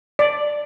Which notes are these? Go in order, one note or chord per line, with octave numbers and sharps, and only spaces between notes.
D5